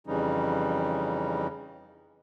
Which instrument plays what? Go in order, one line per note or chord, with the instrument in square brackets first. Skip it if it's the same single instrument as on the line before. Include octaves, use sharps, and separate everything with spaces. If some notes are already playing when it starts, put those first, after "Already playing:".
[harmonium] F2 C#3 E3 G3 C#4 D#4